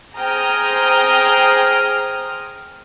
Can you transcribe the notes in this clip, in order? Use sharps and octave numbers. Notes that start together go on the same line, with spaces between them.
G#4 C5 G5 A#5 D#6 F6